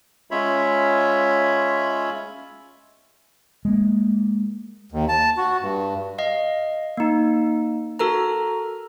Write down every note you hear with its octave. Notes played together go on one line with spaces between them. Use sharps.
G#3 C#4 F4 C#5 E5 B5
G#3 A#3
D#2
A5
F#4
G2
D#5 F5
A#3 D#4
F#4 A4 A#4 A#5